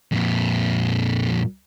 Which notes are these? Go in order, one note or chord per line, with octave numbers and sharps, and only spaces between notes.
F2 A#2